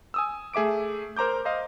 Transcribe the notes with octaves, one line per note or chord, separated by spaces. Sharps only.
G#5 D#6 E6
A3 G#4 E5 D6 D7
A#4 C5 A#5 D6 G6
C5 D#5 F5